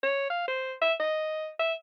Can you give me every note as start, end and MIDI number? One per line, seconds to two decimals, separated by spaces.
0.03 0.28 73
0.30 0.46 77
0.48 0.73 72
0.82 0.93 76
1.00 1.49 75
1.59 1.74 76